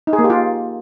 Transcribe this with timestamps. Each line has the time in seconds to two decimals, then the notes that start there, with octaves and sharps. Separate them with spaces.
0.07 D#4
0.13 G#4
0.19 A#3
0.24 G4
0.30 F4